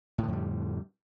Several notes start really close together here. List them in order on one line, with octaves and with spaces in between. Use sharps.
A2 D3 F2 G3